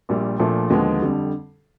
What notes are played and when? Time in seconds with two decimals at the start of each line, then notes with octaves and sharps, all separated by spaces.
0.09 A#1 A#2 G3
0.39 A#1 A#2 F3 A3
0.70 D#2 D3 F3 G#3 B3
1.00 F2 D3 G3